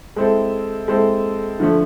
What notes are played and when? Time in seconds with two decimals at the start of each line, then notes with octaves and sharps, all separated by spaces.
0.16 G#3 C4 E4 A4
0.88 G#3 C4 E4 A4
1.60 D3 F3 A3